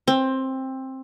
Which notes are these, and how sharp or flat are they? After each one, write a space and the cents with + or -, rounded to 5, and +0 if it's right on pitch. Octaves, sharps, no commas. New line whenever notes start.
C4 +15